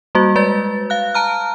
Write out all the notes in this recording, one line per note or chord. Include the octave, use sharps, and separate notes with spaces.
G3 A#3 F#4
G#3 B4 D5 A6
F5 F#6
A5 A#5 F6